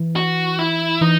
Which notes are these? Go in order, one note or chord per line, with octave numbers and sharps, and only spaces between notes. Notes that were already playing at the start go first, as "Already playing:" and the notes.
Already playing: E3
F#4
E4
E3 D#4